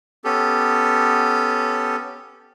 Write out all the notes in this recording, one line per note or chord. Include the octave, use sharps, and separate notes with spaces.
B3 C#4 G4 A4